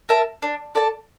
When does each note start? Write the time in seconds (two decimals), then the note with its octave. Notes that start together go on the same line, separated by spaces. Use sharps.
0.09 A#4 E5 A5
0.42 D4
0.75 A4 D5 A5